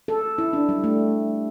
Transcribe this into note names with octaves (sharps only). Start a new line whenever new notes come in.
A4
E4
D4
G3
A3